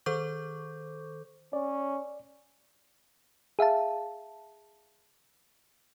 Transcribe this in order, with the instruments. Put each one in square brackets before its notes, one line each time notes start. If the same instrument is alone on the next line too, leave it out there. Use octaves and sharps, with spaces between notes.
[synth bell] D#3 A4 C5 C#6 D6 G6
[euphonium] C#4 [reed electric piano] C#5 D5
[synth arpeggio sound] G#4 E5 F5 A5